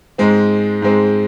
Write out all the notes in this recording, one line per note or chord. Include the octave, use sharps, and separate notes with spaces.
G#2 G#3 C4
G#2 G#3 C4